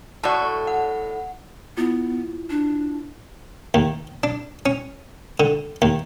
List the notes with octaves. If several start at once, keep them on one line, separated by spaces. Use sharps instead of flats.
A2 F#4 D5 A5
F#5
B3 E4 F4
D4
D#2
D4
C#4
D3
D#2